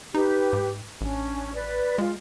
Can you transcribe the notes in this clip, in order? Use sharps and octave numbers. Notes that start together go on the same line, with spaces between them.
D#4 G4 B4
G#2
A1 C#4 D4
B4 D5
G#3 F4